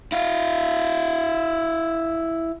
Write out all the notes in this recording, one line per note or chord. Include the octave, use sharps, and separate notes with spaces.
E4 F5